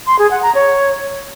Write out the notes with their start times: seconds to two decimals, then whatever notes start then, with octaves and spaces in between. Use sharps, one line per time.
0.07 C6
0.19 G#4
0.31 F#5
0.43 A#5
0.55 C#5